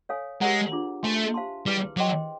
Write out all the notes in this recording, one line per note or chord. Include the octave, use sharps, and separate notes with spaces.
A4 C#5 F5 G#5
G#3 G4 A#4 C#5 F#5 A#5
D4 F4 G#4
A3 C5 E5 G#5 C6
G4 C5 F5 A5 C6
G3 E4 G#4 B4
F#3 G#4 C5 D#5 G5 C6